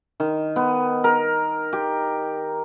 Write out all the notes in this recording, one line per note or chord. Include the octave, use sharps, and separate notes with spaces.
D#3
B3
A#4
G4